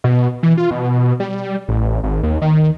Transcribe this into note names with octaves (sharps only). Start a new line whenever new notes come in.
B2
E3
F4
B2
G3
A1
G#1
D#2
D#3